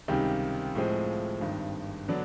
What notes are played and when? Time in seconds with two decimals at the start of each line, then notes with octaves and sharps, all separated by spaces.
0.08 C#2 C3 D#3 G3
0.75 A2 F3 G#3 C4
1.41 G#1 G2 D#3
2.08 D3 F#3 B3 D4